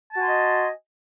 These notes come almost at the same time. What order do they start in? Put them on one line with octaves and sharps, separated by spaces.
A5 F#4 G#5 C6 D#5